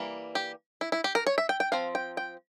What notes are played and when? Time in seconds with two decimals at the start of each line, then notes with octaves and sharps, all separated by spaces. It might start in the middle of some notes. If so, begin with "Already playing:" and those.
Already playing: E3 G3 A#3
0.35 G4
0.81 E4
0.92 E4
1.04 G4
1.15 A#4
1.27 C#5
1.38 E5
1.49 G5
1.60 G5
1.72 F3 C4 F5
1.95 G5
2.17 G5